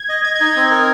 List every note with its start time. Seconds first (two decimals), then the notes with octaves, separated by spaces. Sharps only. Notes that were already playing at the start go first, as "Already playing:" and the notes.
Already playing: G#6
0.09 D#5
0.25 D#5 G#6
0.35 G#6
0.40 D#4
0.46 G#6
0.56 C4
0.71 A#4